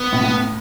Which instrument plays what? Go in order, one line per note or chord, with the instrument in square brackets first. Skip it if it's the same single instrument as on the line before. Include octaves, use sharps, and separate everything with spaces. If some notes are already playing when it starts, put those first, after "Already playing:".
Already playing: [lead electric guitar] B3
[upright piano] A2
A2